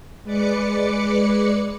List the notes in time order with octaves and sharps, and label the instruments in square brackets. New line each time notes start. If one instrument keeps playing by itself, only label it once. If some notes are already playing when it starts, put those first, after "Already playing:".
[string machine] G#3 B4 D5 D6 C#7